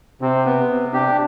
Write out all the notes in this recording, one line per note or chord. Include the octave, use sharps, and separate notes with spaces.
C3 C4
B3
C3
D4 G4